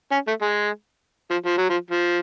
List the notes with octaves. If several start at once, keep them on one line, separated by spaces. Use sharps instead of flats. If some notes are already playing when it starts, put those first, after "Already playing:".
C#4
A3
G#3
F3
F3
F#3
F3
F3